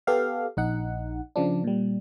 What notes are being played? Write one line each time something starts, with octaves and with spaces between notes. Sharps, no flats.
B3 G4 A4 F5
A#1 D#4 F#5
C#3 F3 D4
A#2 G3